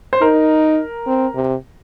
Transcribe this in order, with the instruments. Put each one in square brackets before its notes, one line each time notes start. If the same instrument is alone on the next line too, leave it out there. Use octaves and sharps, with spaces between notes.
[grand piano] C5
[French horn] D#4 [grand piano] A#4
[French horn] C4
C3